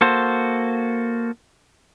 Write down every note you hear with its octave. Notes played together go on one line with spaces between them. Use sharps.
A#3 F#4 A4 C5